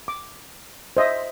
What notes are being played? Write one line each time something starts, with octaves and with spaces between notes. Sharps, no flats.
D6
C5 D#5 E5